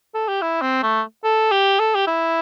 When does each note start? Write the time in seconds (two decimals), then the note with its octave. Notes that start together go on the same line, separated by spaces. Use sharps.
0.15 A4
0.28 G4
0.42 E4
0.62 C4
0.83 A3
1.24 A4
1.52 G4
1.79 A4
1.95 G4
2.07 E4